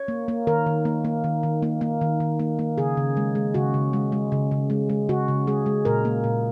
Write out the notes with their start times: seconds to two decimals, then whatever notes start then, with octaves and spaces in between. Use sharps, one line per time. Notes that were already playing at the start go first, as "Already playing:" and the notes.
Already playing: C#5
0.08 A#3
0.28 A#3
0.47 D#3 A#4
0.66 D#3
0.85 A#3
1.04 A#3
1.24 D#3
1.43 D#3
1.63 A#3
1.81 A#3
2.01 D#3
2.20 D#3
2.40 A#3
2.59 A#3
2.78 C#3 G#4
2.97 C#3
3.17 G#3
3.35 G#3
3.54 C#3 F#4
3.74 C#3
3.93 G#3
4.12 G#3
4.32 C#3
4.51 C#3
4.70 G#3
4.90 G#3
5.09 C#3 F#4
5.28 C#3
5.47 G#3 G#4
5.66 G#3
5.85 A#2 A#4
6.05 A#3
6.24 A#2